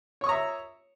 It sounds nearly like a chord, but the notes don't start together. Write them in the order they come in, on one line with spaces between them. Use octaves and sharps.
C#5 C#6 D#6 A#5 E5